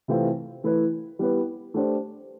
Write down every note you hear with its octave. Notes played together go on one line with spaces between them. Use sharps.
C3 E3 A3 C4 F4
E3 A3 E4 B4
G3 B3 E4 B4
A3 D4 G4 C5